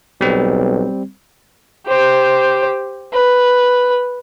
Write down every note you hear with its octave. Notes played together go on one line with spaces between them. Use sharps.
B1 G3 C4
G4 C5
B4